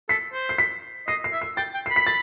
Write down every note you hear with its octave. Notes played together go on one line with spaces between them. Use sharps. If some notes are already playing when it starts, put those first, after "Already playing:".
A4 B6
C5
C7
B6
D#5 C7
C7
E5
C7
G5 A6
G5
B5 C7
B6
A6